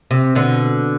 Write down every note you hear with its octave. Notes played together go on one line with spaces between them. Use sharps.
C3
B2 D3